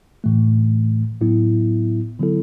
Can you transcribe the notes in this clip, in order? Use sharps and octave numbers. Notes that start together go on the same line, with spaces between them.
A2 E3 A3
A2 F#3 B3 E4
D3 F#3 B3 E4 A4